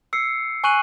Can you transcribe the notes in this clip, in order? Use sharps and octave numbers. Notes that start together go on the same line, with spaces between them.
E6 C7 C#7
G#5 C#6 F#6 D#7 F#7